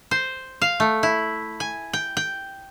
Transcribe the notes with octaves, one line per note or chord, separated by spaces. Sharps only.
C5
F5
A3
E4
G#5
G5
G5